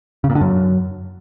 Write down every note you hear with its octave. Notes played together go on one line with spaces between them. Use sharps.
C#3
A#2
D3
F#2